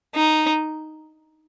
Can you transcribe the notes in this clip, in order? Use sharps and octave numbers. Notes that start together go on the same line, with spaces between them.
D#4